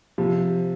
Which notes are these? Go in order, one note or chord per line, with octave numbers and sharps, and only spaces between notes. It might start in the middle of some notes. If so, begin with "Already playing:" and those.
C3 F3